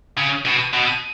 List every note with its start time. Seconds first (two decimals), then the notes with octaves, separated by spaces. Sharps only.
0.18 C#3
0.46 B2
0.74 B2